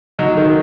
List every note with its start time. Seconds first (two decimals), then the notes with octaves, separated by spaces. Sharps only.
0.19 F#3 D#4
0.37 D#3